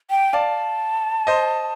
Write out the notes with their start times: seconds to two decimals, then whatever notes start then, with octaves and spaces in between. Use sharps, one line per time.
0.10 G5
0.33 D5 F5 A5
1.27 C5 D#5